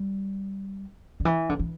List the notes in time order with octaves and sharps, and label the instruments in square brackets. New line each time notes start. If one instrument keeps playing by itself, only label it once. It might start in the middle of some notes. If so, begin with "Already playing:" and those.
Already playing: [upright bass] G3
D3
E3
D3
E3